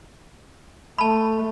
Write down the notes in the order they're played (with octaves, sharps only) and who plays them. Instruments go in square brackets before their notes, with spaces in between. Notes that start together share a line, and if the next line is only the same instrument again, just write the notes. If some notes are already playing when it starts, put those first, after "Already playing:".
[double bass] A3 [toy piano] A5 B5